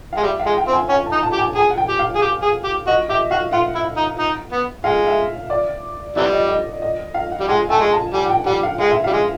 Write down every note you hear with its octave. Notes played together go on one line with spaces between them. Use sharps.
G#3 F5
G3 E5
F5
G#3
G5
C4
G#5
C#4 G#5
A5
D#4
A5
G4
G#5
G#4 G#5
F#5
G5
G4
F5
G#4
G4
G#4
G4
F#4 D#5
G4 E5
F#4 F5
F4 F#5
E4
D#4
D#4
B3
G#3 F5
E5
D5
C3 E3 G3 D5
D#5
D#5
D#5
F5
F#5
G3
G#3 G#5
A3 G#5
G#3
A5
G3 G#5
F#5
G5
G3 F#5
F5
G#3 F5
E5
G3 F5
G#3